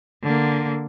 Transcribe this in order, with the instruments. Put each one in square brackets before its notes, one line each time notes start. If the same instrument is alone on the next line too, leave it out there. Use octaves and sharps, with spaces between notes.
[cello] D3 A#3